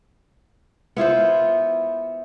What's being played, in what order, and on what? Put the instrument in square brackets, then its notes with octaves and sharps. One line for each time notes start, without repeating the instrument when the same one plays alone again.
[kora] B3 E4 F4 C5